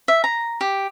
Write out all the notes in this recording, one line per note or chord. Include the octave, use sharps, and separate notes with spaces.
E5
A#5
G4